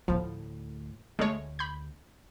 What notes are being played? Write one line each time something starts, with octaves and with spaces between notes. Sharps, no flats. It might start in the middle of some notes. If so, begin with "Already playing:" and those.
D2 A2 F3
D2 G#3 A3 C#5
B5 G6